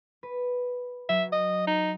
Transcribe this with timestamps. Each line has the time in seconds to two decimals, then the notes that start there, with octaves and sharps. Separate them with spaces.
0.23 B4
1.09 F#3 E5
1.32 D#5
1.67 D#4